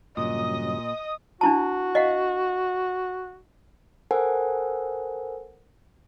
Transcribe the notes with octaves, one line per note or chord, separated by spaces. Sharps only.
G2 A#2 C#3 F#3 D#5 D#6
D4 E4 F#4 A5
D#5 F5 F#5
A4 A#4 C5 F#5 G#5